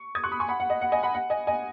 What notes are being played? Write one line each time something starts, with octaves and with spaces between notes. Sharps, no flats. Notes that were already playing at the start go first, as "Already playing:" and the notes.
Already playing: C#6
D#6 G#6
C#6 F#6
B5 D#6
G#5 C#6
F#5 B5
F#5
D#5
F#5
D#5 G#5
F#5 B5
F#5
D#5 G#5
D#5 G#5